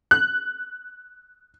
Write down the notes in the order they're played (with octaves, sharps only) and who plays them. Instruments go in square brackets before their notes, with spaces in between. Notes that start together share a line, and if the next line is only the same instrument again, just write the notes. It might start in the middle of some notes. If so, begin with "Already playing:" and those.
[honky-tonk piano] F#6